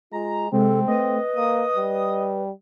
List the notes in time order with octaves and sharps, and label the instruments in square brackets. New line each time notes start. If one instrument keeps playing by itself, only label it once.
[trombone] G#3 [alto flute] F4 [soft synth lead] A#5
[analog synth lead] C3 [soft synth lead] G#3 [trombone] C4 [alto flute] A4
[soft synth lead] A3 [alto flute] B4 [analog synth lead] D#5
[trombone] A#3 [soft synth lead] D#6
[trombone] G3